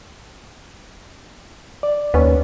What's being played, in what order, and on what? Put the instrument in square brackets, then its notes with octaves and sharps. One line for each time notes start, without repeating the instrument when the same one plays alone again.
[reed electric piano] D5
[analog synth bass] D#2 [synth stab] B3 C#4